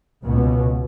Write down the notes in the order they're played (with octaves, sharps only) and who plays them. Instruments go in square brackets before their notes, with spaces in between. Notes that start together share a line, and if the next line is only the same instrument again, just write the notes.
[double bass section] C#2 B2